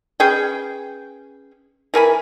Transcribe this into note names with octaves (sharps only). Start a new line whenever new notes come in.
C#4 G#4 B4 G5
E3 A#4 G#5 B5